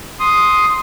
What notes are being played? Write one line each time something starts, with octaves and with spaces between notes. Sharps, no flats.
C6 D#6